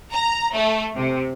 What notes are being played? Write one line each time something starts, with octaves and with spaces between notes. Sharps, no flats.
A#5
A3
C3